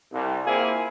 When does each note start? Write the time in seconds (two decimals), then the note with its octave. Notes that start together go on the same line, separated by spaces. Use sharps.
0.12 C2
0.45 A#3 C4 E4 F4 G#4